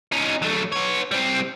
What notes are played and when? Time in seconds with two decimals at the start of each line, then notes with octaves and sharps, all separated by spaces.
0.12 C#4 D#4
0.42 F#3 A3
0.73 B3 C#5
1.12 G3 C4